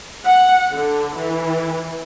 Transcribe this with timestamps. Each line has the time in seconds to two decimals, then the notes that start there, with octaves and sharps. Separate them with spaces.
0.25 F#5
0.73 D3
1.17 E3